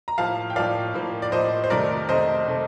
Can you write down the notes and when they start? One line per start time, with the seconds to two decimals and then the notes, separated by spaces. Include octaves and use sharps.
0.08 A#5
0.18 A2 F3 A#3 F5 A5
0.50 G5
0.56 A2 F3 A#3 D5 F5
0.94 A2 F3 A#3
1.22 D5
1.32 A2 F3 A#3 C5 D#5
1.64 C5
1.70 F2 C3 D#3 A3 A#4 D5
2.09 F2 C3 D#3 A3 C5 D#5
2.48 C3 D#3 A3